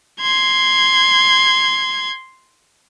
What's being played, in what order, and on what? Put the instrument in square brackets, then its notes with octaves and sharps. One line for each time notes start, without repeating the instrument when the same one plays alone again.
[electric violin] C6 G#6